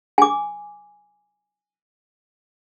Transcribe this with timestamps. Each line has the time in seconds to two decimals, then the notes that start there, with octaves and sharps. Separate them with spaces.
0.18 G#5 D6